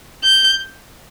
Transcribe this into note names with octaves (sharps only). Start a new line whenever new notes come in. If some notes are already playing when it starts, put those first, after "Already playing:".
G6